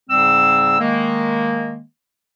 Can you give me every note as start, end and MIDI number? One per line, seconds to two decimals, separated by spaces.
0.10 0.77 44
0.10 0.77 49
0.10 0.77 55
0.10 0.77 60
0.10 0.77 88
0.80 1.83 51
0.80 1.83 56
0.80 1.83 58